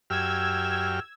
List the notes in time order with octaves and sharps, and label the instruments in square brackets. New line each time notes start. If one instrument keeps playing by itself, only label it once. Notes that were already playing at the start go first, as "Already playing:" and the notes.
[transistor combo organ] F#2 G4 F6 [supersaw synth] E6 G#6